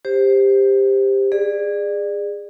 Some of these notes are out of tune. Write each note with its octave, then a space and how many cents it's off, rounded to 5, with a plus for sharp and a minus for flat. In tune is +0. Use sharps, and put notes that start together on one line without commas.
G4 +15 C5 +0
G#4 -20 D5 +20